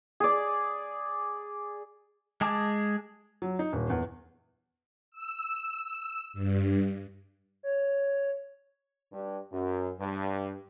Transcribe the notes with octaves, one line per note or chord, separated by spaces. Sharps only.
G#4 D5
G#3 G#4 A5 D6
F#3
D#4
D#1
E2
E6
G2
C#5
G2
F#2
G2